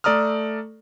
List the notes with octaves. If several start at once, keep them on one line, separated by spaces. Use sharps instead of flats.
A3 A4 D5 A#5 D#6 F6